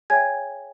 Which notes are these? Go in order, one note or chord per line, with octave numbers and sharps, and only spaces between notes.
G#4 C#5 E5 G5 G#5 G#6